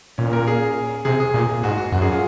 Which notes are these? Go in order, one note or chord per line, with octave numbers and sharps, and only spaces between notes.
A#2 C#4
A#4
G#4
C3 G#4
G#4
A#2
G#2 F#4
F#4
F#2 F#4
G#4
F4